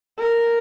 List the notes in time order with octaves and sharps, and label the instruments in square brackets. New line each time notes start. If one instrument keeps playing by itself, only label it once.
[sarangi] A#4